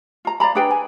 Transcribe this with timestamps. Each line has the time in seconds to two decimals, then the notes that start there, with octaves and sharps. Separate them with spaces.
0.25 F4 A#5
0.40 D5 F5 A#5 B5
0.55 D4 G#4 B4 G5
0.71 G#5